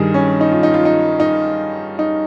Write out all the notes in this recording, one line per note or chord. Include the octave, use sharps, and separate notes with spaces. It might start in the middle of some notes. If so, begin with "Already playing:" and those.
Already playing: G2 D#3 G3 G#4
C#4
D#4
F4
D#4
F4
D#4
D#4
D#4